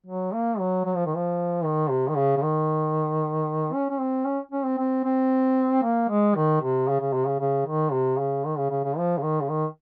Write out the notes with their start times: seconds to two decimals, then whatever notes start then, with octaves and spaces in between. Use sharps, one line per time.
0.06 F#3
0.33 A#3
0.59 F#3
0.85 F#3
0.95 F3
1.06 D#3
1.16 F3
1.64 D#3
1.90 C3
2.08 D#3
2.16 C#3
2.37 C#3
2.42 D#3
3.73 C#4
3.90 C#4
4.00 C4
4.25 C#4
4.52 C#4
4.64 C4
4.78 C4
5.04 C4
5.83 A#3
6.09 G#3
6.35 D#3
6.61 C3
6.88 C#3
7.00 C#3
7.13 C3
7.27 C#3
7.40 C#3
7.66 D#3
7.92 C3
8.19 C#3
8.45 D#3
8.58 C#3
8.71 C#3
8.84 C#3
8.98 F3
9.18 C#3
9.23 D#3
9.41 C#3
9.49 D#3